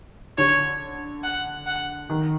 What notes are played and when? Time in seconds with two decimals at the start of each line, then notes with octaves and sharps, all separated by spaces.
0.38 D3 C#5
1.23 F#5
1.66 F#5
2.10 D#3